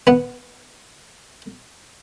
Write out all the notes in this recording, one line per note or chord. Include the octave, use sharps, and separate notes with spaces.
B3 F#5